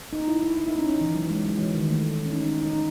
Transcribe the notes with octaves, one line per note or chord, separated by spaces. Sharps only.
D#4
E4
E4
E4
D#4
C#4
D#4
E3
F#3
G#3
F#3
E3
D#3
A3
C#4
D#4
C#4
D#4